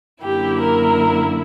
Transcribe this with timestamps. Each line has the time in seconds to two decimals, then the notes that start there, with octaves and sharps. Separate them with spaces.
0.23 F#2 D3 A#3 E4 G4
0.60 A#4